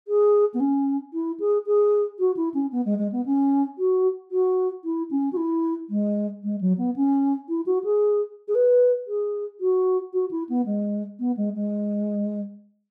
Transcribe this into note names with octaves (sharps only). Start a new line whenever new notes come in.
G#4
B3
C#4
E4
G#4
G#4
F#4
E4
C#4
B3
G#3
G#3
B3
C#4
F#4
F#4
E4
C#4
F#4
E4
G#3
G#3
F#3
B3
C#4
E4
F#4
G#4
G#4
B4
G#4
F#4
F#4
E4
B3
G#3
B3
G#3
G#3